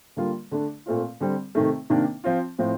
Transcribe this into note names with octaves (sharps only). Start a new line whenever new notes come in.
D3 G3 A#3 F4
D3 A3 D4
A#2 A3 C4 F4
D3 G3 C4
C3 D#3 A3
C3 D#3 A#3 D4
F3 C4 F4
A2 F3 C4